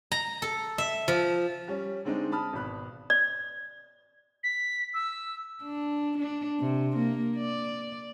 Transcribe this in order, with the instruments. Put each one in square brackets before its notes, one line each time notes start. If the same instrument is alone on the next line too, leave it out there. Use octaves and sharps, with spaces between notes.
[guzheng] A#5
A4
E5
F3
[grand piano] G3 C#4
D3 G#3 C4 D4 D#4
A5 B5 D#6 F6
G#1 B2 B5 F#6
[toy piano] D5
[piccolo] B6
E6
[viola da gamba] D4
D4
C3
A#3
D5